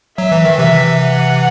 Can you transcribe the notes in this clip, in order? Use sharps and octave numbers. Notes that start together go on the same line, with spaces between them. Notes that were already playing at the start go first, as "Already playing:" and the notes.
F#3 E5
E3
D#3
C3 E3 E5
F#5